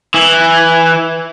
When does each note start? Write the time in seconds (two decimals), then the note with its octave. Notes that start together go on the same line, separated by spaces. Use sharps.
0.14 E3